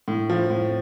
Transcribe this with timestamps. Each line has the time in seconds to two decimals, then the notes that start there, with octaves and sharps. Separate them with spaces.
0.08 A2
0.30 F3
0.50 A2